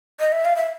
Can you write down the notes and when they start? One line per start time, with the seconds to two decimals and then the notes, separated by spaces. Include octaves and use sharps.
0.20 D#5
0.32 E5
0.45 F5
0.56 E5